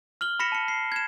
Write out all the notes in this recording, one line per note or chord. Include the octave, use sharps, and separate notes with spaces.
F6 F#7 G7
B5 A#6 B6 C#7 E7
A5 C#7
C7
G#6 E7